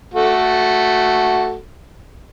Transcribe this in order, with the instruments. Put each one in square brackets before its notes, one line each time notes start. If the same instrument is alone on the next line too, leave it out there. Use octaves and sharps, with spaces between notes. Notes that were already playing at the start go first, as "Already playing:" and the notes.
[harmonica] A3 F#4 A4